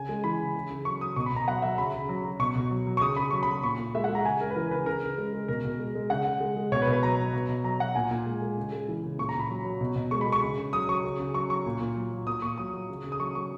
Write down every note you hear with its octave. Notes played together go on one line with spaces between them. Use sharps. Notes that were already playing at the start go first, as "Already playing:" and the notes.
Already playing: C#3 G#5
G#3
E3 B5
C#3
C#3
C#3
F#3 C#6
F#3 D#6
B2 C#6
B5
B2 A#5
F#3 F#5
F#3 E5
C#3 B5
C#3
F#3
F#3
B2 C#6
B2
F#3
F#3
C#6
C#3 D#6
C#3 B5
F#3 C#6
B5
F#3
A#2 C#6
A#2
G#3 E5
F#5
G#3
A#5
C#3 G#5
G#3 A#4
B4
E3 A#4
C#3 B4
C#3 A#4
C#3
G#3
G#3
B2 A#4
B2
G#3
G#3
C#3 F#5
C#3
G#3
G#3
B2 C#5
B4
B2
B4
F#3 A#5
F#3
B2
B2
F#3 A#5
F#3 F#5
A#2 G#5
A#2
G#3
G#3
C#3
G#3
E3
C#3
A#2 C#6
A#5
A#2 B5
F#3
F#3
B2
B2
G#3 C#6
B5
G#3
C#6
C#3
C#3
F#3 D#6
F#3 C#6
C#3
C#3
F#3 C#6
F#3 C#6
A#2
A#2
F#3
F#3
A#2 D#6
A#2 C#6
F#3 D#6
F#3
C#3
C#3
D#6
F#3 C#6
F#3 C#6